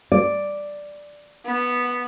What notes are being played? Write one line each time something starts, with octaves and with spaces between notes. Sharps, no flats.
D5
B3